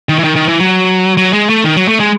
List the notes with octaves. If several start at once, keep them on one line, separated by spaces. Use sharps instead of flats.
D#3
E3
D#3
D#3
E3
F#3
F#3
G#3
A3
D#3
F#3
A3
G#3